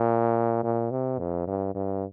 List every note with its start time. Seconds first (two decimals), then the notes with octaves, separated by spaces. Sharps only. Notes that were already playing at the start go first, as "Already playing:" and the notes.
Already playing: A#2
0.63 A#2
0.91 C3
1.19 F2
1.47 G2
1.75 G2